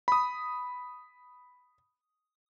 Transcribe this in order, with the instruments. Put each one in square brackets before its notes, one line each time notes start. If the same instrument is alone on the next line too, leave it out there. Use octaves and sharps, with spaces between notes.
[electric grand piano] B5 D#6